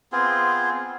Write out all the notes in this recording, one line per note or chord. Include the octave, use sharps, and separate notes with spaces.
B3 C4 F4 G#4